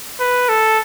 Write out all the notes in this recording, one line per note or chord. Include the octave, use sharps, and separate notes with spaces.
B4
A4